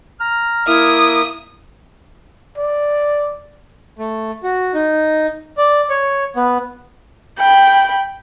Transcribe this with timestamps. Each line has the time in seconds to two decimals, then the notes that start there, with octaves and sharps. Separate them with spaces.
0.21 A#5 F6
0.67 A#3 E4 A#4 E5 D#6
2.58 D5
3.99 A3
4.43 F#4
4.74 D#4
5.57 D5
5.90 C#5
6.36 B3
7.38 G5 B5